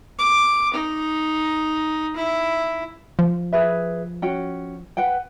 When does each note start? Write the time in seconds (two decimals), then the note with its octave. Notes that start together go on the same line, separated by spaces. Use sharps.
0.19 D6
0.74 D#4
2.16 E4
3.19 F3
3.53 G#4 B4 E5
4.22 C#4 F#4 G5
4.97 B4 F#5 G5